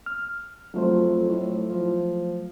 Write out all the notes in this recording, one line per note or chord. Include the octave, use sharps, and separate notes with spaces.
F6
F2 F#3 A3 C5
A2
F3